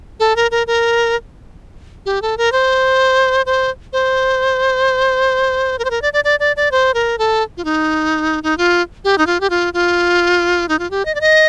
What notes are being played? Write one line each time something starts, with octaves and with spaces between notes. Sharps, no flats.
A4
A#4
A#4
A#4
G4
A4
A#4
C5
C5
C5
A#4
C5
A#4
D5
D5
D5
D5
D5
C5
A#4
A4
F4
D#4
D#4
F4
G4
D#4
F4
G4
F4
F4
D#4
F4
G4
D#5
D5
D#5